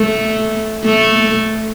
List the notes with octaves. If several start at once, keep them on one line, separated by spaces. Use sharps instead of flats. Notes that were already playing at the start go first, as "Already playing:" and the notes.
Already playing: A3
A3